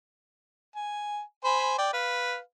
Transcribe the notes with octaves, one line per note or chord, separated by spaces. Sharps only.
G#5
C5 G#5 B5
D5 G5
B4 F5